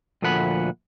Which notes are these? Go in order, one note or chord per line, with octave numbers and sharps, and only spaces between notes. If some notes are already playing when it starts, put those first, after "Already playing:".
D2 A#2 F3 A3 F#5 B5